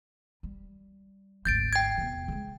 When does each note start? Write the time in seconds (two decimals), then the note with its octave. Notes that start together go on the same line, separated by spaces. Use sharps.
0.43 G3
1.45 G#1 D2 G6 A6 D7
1.73 G5 G#6
1.98 E2 C3
2.28 C#3 G#3